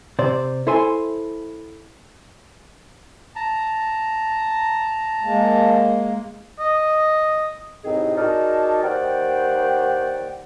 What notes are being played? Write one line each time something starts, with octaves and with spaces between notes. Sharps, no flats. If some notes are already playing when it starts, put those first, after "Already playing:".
C3 C5 D5
E4 A4 C5 E5 G#5 C6
A5 A#5
G#3 A#3
D#5
C2 A2 C4 D#4 G#4 D#5
D#4 F#4 G#4 A#4 D5 A5
D#2 C5 D5 F#5 G5